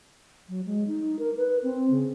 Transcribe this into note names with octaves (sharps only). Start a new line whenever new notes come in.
F#3
G#3
D#4
A#4
B4
C4
C#3